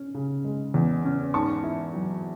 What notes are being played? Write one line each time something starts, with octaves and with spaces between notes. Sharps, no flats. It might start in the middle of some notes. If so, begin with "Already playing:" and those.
Already playing: C#4
C#3
G#3
E2
C#4
G#2 A5 C#6
E4
F#3